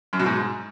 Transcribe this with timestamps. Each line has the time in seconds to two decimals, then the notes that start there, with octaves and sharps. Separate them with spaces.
0.13 F#2
0.19 B2
0.26 G#2